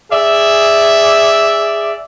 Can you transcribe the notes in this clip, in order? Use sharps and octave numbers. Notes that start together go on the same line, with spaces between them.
G#4 D5 E5